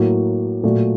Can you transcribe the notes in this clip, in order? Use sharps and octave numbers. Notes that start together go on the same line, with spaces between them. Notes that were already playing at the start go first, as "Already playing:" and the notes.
Already playing: A2 F#3 A#3
A#2 F#3 A3